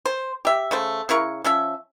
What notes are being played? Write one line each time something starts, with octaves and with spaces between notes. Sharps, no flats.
C5
G4 E5
C#3 A3 C5
C#3 E4 A#4 C#6
F3 C#4 E5